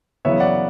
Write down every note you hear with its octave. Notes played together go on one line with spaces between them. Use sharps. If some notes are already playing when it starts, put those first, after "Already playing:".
F#2 C#3 E3 B3 C#5 E5
D5 F#5